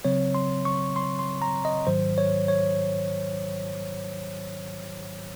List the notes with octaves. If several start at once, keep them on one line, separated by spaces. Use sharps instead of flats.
C#3 F#3 C4 C#5
C6
C#6
C6
C6
A#5
D#5
G#2 D#3 F#3 C5
C#5
C#5